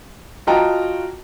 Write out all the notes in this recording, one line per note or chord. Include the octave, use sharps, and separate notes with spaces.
F4 F#4 D#5 G5 A5 A#5